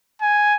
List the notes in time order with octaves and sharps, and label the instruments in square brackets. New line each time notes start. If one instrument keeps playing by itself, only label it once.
[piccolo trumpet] G#5